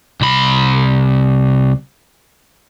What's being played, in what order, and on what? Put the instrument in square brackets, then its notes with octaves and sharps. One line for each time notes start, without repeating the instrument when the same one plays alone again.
[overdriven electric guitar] C2 B5